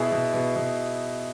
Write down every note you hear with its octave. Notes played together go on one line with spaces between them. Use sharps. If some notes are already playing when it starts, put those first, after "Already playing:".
Already playing: B2 E4 G#4
B2
B2
B2